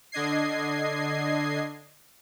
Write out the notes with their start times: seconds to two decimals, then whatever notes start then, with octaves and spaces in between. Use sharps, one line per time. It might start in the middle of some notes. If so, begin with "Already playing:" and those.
0.12 D3 D4 D#5 G#6 C7